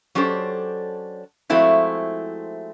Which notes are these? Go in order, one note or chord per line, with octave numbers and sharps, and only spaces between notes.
F#3 C#4 D4 G4 A4 C5
F3 G#3 A3 C4 E4 F#4